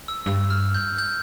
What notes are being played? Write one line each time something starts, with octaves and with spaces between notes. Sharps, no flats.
E6
G2 E6
F6
G6
G6